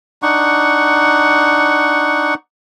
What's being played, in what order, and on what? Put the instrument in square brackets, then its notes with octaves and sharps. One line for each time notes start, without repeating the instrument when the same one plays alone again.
[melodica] D4 D#4 F#5 C#6